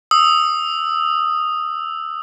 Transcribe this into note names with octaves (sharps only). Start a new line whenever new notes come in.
D#6 E6